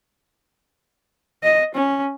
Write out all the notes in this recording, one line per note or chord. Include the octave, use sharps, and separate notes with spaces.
D#5
C#4